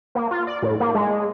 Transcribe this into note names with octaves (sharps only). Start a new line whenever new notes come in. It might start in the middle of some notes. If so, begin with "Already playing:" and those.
A#3
F4
D5
A2
A#3
G#3